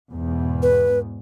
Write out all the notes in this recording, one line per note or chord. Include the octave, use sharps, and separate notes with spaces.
E2 G#2 B2
B4